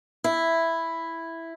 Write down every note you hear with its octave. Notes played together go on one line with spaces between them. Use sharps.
E4